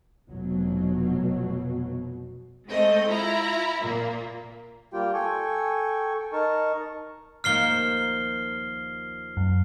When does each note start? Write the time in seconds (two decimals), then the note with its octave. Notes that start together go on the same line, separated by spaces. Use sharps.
0.29 F1 B2 F#3
2.68 G#3 A3 C4 D#5
3.09 E4 F4 A#5
3.82 A#2 A#3
4.93 G3 A#3 F4 G4 G5
5.14 A4 G5 G#5 C#6
6.33 D#4 A#4 A5 C#6
7.44 D#2 F3 A#3 F6 C7 G7
9.37 F#2